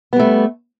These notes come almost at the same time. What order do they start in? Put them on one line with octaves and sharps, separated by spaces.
B3 G3 A3